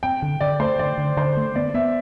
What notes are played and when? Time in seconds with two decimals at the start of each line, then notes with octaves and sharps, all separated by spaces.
0.03 C4 G5
0.22 D3
0.41 D3 D5
0.60 A3 C5
0.79 D3 D5
0.98 D3
1.17 D3 C5
1.37 A3
1.56 B3 D5
1.74 B3 E5